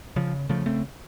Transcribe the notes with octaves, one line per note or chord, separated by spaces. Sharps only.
C#3 F3
C#3 F3 A3
A3 C4